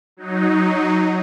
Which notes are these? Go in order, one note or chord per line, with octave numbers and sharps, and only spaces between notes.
F#3 D#4